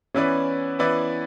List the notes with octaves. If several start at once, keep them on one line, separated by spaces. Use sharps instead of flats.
E3 B3 C#4 E4 B4 D5
E3 B3 E4 B4 D5